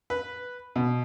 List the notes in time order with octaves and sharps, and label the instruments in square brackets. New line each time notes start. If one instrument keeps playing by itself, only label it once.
[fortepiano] B4
B2